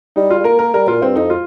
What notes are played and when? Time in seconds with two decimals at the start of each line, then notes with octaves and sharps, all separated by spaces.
0.16 G3 D#4
0.30 F4
0.39 G3
0.44 A#3 A#4
0.59 A#4
0.74 G3 A#4
0.88 A#2 F4
1.02 G2 C4
1.16 F2 D#4
1.30 F4